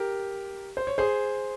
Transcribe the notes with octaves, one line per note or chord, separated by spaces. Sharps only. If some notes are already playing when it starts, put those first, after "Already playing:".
Already playing: G4 A#4
C5
C#5
G#4 C5